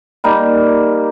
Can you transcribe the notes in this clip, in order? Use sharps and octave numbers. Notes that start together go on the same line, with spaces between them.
G3 A#3 D#4